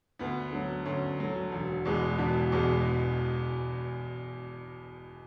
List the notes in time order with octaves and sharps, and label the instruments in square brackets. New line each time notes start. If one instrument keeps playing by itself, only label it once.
[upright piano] D2 B3
D3 F#3
D2 C#4
D3 F#3
E1
E2 B2 G#3
E1 D4
E2 B2 G#3